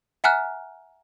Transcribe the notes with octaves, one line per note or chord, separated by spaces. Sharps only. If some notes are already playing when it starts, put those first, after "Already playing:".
E5 F#5 G#5 A#5 F6 F#6